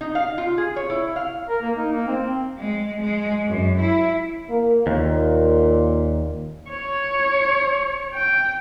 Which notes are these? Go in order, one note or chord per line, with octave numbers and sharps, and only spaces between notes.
D#4
F5
F4
G#4
C#5
E4
F5
A#4
A#3
D#4
A#3
C4
G#3
G#3
F#2
E4
A#3
D#2 A#2
C#5
G5